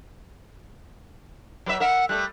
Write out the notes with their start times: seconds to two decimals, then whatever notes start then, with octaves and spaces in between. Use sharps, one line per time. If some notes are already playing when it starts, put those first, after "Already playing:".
1.66 F#3 B4 E5
1.80 A#4 E5 F#5
2.09 G3 A3 F#6